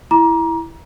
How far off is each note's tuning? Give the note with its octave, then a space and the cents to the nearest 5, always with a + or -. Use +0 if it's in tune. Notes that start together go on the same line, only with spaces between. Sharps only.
E4 +0 A#5 +25 D6 -10